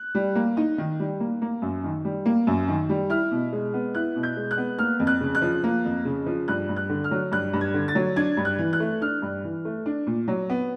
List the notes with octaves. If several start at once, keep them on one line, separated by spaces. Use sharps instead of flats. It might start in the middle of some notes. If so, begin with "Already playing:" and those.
Already playing: F#6
G3
A#3
D#4
D#3
G3
A#3
A#3
F#2
D#3
G3
A#3
F#2
D#3
G3
E4 F6
B2
G#3
B3
E4 F#6
B2
G6
G#3
F#6
B3
A#3 F6
F2
F#6
C#3
F#6
F3
A#3
F2
C#3
F3
G2 F#6
G2
F#6
D3
F6
F#3
G2 F#6
G2
G#6
D3
A6
F#3
D4 G#6
G2
F#6
E3
F#6
A3
D4 F6
G2
E3
A3
D4
A#2
F#3
B3